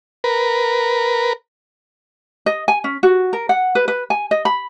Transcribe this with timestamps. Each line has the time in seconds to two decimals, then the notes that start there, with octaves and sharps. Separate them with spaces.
0.24 A#4 B4
2.46 D#5
2.68 G#5
2.84 C#4
3.03 F#4
3.33 A#4
3.49 F#5
3.75 B4
3.88 B4
4.10 G#5
4.31 D#5
4.45 B5